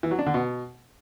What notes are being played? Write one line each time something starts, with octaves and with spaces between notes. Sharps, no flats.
E3
F#3
D4
D3
B2